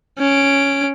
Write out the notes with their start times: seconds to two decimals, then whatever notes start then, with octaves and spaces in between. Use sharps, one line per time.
0.19 C#4 D7